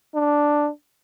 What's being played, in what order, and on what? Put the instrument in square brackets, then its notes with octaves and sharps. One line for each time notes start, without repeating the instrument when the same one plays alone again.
[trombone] D4